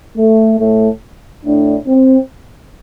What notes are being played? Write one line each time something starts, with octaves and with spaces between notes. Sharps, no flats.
A3
A2 A3
A2 A3 D4
C4